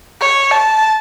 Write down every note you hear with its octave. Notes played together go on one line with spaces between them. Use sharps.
C#5
A5